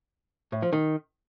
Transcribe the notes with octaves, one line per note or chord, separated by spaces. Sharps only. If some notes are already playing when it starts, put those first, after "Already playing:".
A2
F3
D#3